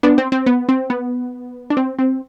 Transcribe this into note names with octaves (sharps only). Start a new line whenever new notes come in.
B3 D4
C4
C4
B3
C4
B3
D4
C4
C4